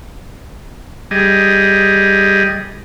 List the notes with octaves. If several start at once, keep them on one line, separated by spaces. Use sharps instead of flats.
G3 G#4 D#5